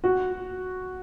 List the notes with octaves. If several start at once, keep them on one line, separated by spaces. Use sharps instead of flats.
F#4